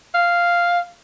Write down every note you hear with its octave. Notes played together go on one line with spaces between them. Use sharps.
F5